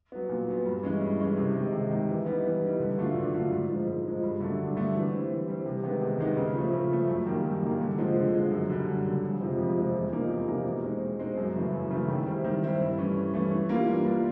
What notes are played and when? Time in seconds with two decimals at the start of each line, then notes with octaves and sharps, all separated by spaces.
0.12 F#3 B3
0.29 A#2
0.48 F#3 B3
0.66 G2
0.83 E3 G#3 C#4
1.01 G2
1.19 E3 G#3 C#4
1.37 C3
1.55 D#3 G#3
1.73 C3
1.91 D#3 G#3
2.09 E3
2.26 G3 B3 D#4
2.44 E3
2.62 G3 B3 D#4
2.80 D3
2.98 F#3 A3 D4 F4
3.15 D3
3.33 F#3 A3 D4 F4
3.51 G#2
3.69 F3 G#3
3.87 G#2
4.05 F3 G#3
4.23 G2
4.40 D3 F#3 A3 D4
4.59 G2
4.76 D3 F#3 A3 D4
4.94 E3
5.12 G3 C4
5.30 E3
5.48 G3 C4
5.66 C3
5.83 D#3 G#3 B3 D#4
6.02 C3
6.19 D#3 G#3 B3 D#4
6.37 C#3
6.55 F3 A3
6.73 C#3
6.91 F3 A3
7.09 F#2
7.26 D#3 G3 A#3
7.44 F#2
7.63 D#3 G3 A#3
7.80 D3
7.98 F3 G#3 C4
8.16 D3
8.34 F3 G#3 C4
8.51 F#2
8.70 D3 G3
8.87 F#2
9.05 D3 G3
9.23 F2
9.41 C3 F3 G#3 C4
9.58 F2
9.76 C3 F3 G#3 C4
9.94 E2
10.13 C3 F3 A#3 D#4
10.30 E2
10.48 C3 F3 A#3 D#4
10.65 B2
10.84 G#3 C4 D#4
11.02 B2
11.19 G#3 C4 D#4
11.37 F#2
11.55 C#3 E3 A3
11.72 F#2
11.91 C#3 E3 A3
12.08 D#3
12.27 G3 C4 E4
12.44 D#3
12.62 G3 C4 E4
12.80 G2
12.98 E3 A3 C#4
13.15 G2
13.34 E3 A3 C#4
13.52 E3
13.69 G3 A#3 D4 F4
13.88 E3
14.05 G3 A#3 D4 F4